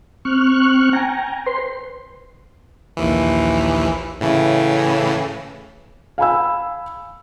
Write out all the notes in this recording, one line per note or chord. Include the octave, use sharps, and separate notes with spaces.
C4 C#6 F6 F#6
G5 G#5 A#5
B4 C5 C6
A#1 D#2 E3
A2 C#3 E3
F5 G#5 B5 E6